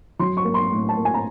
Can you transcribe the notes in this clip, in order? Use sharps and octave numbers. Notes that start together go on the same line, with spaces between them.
F#3 C6
C#6
A#3
C6
A2
A5
A#3
G#5
A#5